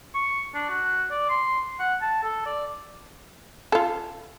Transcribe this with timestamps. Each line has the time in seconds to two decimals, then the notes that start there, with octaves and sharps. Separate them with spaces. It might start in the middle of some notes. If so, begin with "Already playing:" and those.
0.14 C#6
0.55 D4
0.69 F#4
1.11 D5
1.29 C6
1.80 F#5
2.01 A5
2.23 A4
2.46 D5
3.72 F4 A4